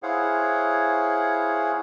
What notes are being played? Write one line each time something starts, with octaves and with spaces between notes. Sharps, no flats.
E4 G#4 C5 C#5 F5 F#5